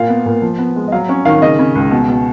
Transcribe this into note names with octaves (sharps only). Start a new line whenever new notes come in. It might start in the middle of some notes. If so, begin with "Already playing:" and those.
Already playing: A#2 F5
B3
A#2
F3
B3
G#3
D#5
F#3 F5
C#4
D#3 F5
C#3 D#5
C#3
C#2
B2
B2